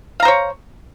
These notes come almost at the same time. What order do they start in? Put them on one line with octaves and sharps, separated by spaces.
F5 A#5 C5 C#5